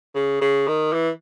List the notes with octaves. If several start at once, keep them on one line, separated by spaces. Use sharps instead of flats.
C#3
C#3
D#3
E3